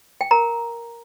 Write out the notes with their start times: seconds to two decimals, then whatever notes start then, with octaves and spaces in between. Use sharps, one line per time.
0.21 G5
0.31 A#4 A#5